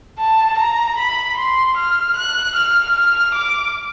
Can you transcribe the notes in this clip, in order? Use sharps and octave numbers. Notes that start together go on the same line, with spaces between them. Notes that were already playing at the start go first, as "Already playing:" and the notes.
A5
A#5
B5
C6
F6
F#6
F6
F6
D6